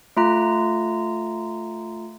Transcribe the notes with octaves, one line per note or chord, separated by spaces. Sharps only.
A3 F4 A#5